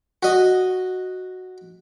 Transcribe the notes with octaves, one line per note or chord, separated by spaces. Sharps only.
F#4 D#5